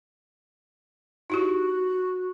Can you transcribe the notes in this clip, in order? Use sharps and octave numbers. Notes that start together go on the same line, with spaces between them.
D#4 E4 F#4 G4